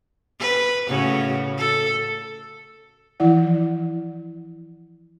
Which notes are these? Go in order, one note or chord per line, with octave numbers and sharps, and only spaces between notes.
B4
A2 C#3 F#4
A4
E3 F3 E4 D5 F#5